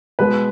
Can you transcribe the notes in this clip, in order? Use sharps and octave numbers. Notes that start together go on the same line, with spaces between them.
B2 G#3 B4